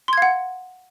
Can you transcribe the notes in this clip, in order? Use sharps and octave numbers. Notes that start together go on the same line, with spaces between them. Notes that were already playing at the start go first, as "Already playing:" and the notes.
F5 F#5 C6 G#6